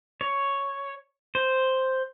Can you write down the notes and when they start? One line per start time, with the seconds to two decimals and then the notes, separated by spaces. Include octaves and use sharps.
0.21 C#5
1.35 C5